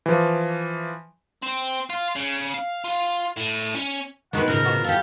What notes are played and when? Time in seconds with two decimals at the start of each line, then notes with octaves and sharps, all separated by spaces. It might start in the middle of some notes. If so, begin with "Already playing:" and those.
0.06 E3 F3
1.42 C4
1.90 F4
2.16 C#3
2.54 F5
2.84 F4
3.36 A2
3.74 C#4
4.33 B2 D#3 G#3 B4 F#5
4.48 A2 C#3 F3 A#4
4.65 B2 F#4
4.84 G4 A4 F5